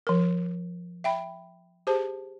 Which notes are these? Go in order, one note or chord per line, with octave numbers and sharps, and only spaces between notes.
F3 A#4
E5 G5 B5
G4 G#4 C5 A5